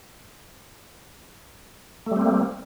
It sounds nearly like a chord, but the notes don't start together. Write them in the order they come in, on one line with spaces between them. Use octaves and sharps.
A3 G3 C4 A#3